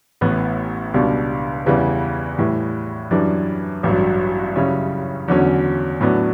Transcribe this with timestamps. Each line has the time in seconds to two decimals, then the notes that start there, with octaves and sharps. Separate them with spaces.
0.21 A1 A2 E3 B3
0.94 C#2 B2 G3 D4
1.66 E2 C#3 E3 G3
2.39 A2 E3 G3
3.11 F#2 E3 G3 D4
3.83 A1 G2 F#3
4.56 F#2 C#3 G3 C#4 E4
5.28 E2 D3 F#3 C#4
6.01 A2 F#3 B3 D4